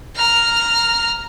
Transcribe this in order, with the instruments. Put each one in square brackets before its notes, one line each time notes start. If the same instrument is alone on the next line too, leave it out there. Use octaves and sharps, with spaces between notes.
[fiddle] A#5 F6